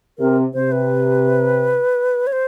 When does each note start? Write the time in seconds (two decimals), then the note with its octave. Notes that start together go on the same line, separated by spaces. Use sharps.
0.19 C3 A#4
0.54 C3 C5
0.72 B4
2.27 C#5
2.33 C5